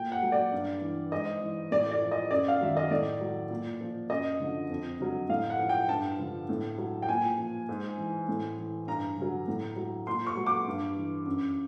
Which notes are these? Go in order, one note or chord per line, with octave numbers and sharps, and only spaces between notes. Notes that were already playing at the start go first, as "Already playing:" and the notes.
Already playing: A#2 G5
F#5
F#3
D5
G2
E3
G#2 D#5
E3
A2 D5
D5
F3
D#5
F#2 D5
F5
D#3 F#3 E5
D#5
A2 D5
F#3
A#2
F3
F#2 D#5
D3 F3
F2
D3 F#3
A2 F5
F#5
F3
G5
G2 A5
D3 F3
A2
F#3
G5
A#2 G#5
F3
G#2
E3
A2
E3
G2 A#5
D3 F#3
A2
F#3
A#2 C6
C#6
F#3
D6
G2
E3
F#2